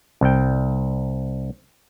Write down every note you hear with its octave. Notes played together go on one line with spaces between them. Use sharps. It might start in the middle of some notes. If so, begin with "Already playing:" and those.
C2 G5